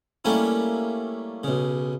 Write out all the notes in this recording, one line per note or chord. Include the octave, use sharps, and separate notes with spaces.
G3 A3 A#3 C#4 E4
B1 C#3